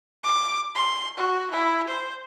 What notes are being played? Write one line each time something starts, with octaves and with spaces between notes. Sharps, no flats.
D6
C6
F#4
E4
C5